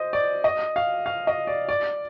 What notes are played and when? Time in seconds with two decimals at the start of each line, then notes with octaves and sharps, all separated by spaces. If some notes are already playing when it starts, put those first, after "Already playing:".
Already playing: C5 D#5
0.13 D5
0.44 D#5
0.76 F5
1.06 F5
1.27 D#5
1.47 D5
1.69 D5